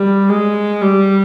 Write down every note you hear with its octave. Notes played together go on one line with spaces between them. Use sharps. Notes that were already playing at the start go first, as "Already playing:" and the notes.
Already playing: G3
G#3
G3